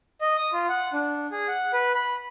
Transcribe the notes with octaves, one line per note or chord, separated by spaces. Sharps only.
D#5
D#6
F4
F#5
D4
G#4
F#5
B4
B5